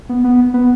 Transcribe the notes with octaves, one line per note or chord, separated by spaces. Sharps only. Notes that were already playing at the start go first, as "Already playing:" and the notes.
B3
B3
B3